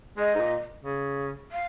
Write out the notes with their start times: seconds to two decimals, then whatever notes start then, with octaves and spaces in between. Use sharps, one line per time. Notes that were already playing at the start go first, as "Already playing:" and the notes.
0.17 G#3 D#5
0.35 G#2
0.40 A#2
0.84 C#3
1.52 F5